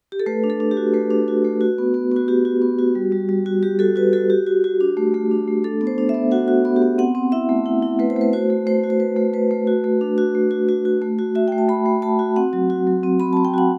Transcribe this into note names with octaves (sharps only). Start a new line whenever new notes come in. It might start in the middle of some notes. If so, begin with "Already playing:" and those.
G4
A4
A3 B4
D4
A4
D4
G4
F#4
A3 B4
D4
F#4
A3
F#4
B3
B3
B3 F#4
F#4 G4
F#4
B3
F#4
G3
G3
G3
F#4
G3 G4
F#4 A4
F#4 B4
F#4 A4
F#4 G4
F#4
F#4
D4
A3
A3
D4
A3
D4 A4
B3
C5
D4
E5
B3
F#4 F#5
F#4
B3
G4
B3
C4 F#5
C4
E4 E5
A3
E4
E4
A3 B4
C5
A3 B4
F#4 C5
A3
A3 C5
F#4
C5
F#4 B4
A3
A3 B4
A3
F#4
A3
D4
F#4
A3
F#4
F#4
F#4
A3
F#4
F#4 E5
A3 G5
A5
A3 B5
A3
A3 A5
F#4
C4 F#5
F#3
F#4
F#3
C4
C4 B5
C4 A5
G5
F#4 F#5